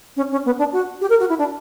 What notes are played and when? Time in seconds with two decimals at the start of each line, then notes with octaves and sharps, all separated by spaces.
0.17 C#4
0.32 C#4
0.46 B3
0.59 D4
0.73 F#4
1.01 G4
1.10 A#4
1.20 F#4
1.29 E4
1.38 D4